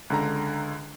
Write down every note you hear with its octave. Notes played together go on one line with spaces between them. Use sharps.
C#2 D3 A#5